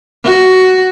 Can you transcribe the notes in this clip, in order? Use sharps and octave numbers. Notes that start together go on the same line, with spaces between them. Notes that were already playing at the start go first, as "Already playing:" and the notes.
F#4